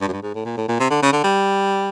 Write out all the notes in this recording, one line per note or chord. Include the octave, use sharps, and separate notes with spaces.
G2
F#2
G2
G#2
A2
A#2
A2
A#2
C3
D3
C#3
D3
G3